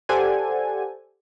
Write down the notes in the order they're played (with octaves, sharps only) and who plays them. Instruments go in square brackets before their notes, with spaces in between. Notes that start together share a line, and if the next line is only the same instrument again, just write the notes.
[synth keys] G4 A4 C5 D5 F#5 G#5